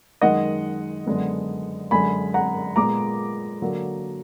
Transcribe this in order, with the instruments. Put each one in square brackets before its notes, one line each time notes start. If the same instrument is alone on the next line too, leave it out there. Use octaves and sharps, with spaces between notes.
[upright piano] F#2 D#3 G#3 D#5 F#5
F#2 D3 G#3 B3
F#2 D3 G#3 G#5 B5
F#5 A#5
A#2 G#3 B3 A#5 D6
D3 F#3 A#3